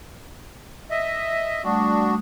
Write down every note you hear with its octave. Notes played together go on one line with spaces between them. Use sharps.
D#5 E5
G3 A3 D4 F#4 D#6